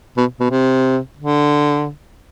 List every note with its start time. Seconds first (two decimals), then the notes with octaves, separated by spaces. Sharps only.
0.17 B2
0.40 B2
0.50 C3
1.18 D3